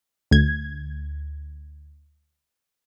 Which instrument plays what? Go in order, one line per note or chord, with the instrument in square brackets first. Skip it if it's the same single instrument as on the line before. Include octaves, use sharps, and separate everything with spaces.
[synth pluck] D2 G#6